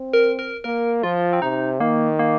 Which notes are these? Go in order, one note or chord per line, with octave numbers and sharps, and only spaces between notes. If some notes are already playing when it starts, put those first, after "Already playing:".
Already playing: C4
A#4
A#4
A#3 A#4
F3 F4
C4
C3 D#4
D#3 A#3
A#3